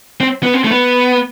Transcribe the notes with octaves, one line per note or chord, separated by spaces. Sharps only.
C4
B3
C4
A3
B3